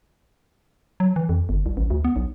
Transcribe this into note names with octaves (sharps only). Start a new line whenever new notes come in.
F#3
E3
F2
G1
C2
A1
D2
B3
B1